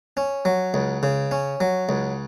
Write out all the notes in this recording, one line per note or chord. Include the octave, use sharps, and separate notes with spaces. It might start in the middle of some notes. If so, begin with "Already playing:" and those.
C#4
F#3
C#2
C#3
C#4
F#3
C#2